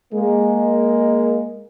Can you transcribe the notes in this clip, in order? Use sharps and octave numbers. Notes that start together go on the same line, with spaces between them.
G#3 A#3